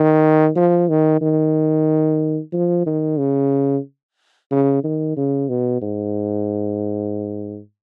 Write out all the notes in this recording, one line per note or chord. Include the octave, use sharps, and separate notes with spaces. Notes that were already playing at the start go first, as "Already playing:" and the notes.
Already playing: D#3
F3
D#3
D#3
F3
D#3
C#3
C#3
D#3
C#3
B2
G#2